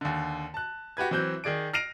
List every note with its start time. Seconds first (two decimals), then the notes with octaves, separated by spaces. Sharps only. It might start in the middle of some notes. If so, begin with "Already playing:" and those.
0.01 D#2 D3
0.54 A5 F#6
0.97 F#4 G4 B4 G#6
1.11 E3 F#3 C4 F#6 G6
1.44 D#3 G#4 D5 D7
1.73 F6 A#6 C7 D7 D#7 F7